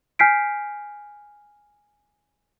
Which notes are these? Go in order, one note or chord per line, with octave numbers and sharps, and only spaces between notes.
G#5 F6 G6 B6 C7 D7